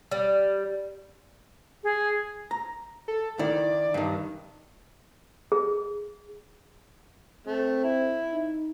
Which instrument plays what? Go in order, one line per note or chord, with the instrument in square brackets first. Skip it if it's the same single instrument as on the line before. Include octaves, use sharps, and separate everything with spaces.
[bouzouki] G3
[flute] G#4
[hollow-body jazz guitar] A#5
[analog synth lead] A4
[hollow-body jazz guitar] D#3 E4 [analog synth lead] D5
[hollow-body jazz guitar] G2 D#3
[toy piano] G#4
[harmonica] A3 [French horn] C4
[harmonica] E4
[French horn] D#4